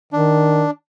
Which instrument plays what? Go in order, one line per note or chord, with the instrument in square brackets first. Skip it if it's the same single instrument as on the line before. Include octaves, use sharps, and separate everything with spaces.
[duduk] D#3 [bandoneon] D4